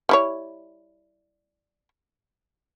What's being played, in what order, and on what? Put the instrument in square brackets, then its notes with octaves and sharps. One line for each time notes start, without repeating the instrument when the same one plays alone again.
[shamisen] G3 E4 C#5